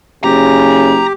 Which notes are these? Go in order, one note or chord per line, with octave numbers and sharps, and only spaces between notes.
F#1 C#3 G4 A#5